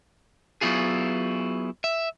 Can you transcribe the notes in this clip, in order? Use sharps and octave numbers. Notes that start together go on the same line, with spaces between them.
F#3 B3 E4 F4 G#4
E5